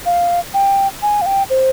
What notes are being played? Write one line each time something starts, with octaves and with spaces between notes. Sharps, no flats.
F5
G5
G#5
F5
G5
C5